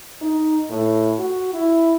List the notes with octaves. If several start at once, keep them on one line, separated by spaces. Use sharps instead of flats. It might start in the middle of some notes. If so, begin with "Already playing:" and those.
D#4
A2
F#4
E4